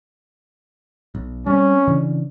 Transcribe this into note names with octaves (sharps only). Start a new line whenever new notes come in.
B1
G3 C4 C#4
C#3 E3 D4